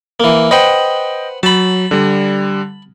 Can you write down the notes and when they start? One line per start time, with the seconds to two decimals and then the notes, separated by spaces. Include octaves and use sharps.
0.20 E3 A#3
0.51 B4 C5 D#5 F#5 G5
1.43 F#3 A5 B5
1.91 D3 G3